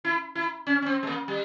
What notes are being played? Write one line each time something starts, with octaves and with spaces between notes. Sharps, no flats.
E4
E4
C#4
C#4
C4
G#3
A#3
G3